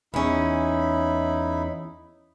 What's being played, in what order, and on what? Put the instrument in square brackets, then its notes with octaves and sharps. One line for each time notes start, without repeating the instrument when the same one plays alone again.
[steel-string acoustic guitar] E2 C#4 [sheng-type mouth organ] D#4 E4 B5